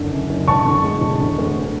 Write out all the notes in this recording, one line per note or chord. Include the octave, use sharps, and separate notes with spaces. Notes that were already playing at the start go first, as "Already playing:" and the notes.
Already playing: F#1 D3
F#2
F#1
E1 A5 C#6
D3
G#3
E1
D3
D2